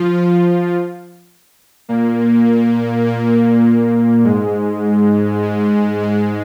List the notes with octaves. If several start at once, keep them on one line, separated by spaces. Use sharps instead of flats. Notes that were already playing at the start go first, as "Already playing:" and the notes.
Already playing: F3 F4
A#2 A#3
A#2 A#3
G#2 G#3
G#2 G#3
G#2 G#3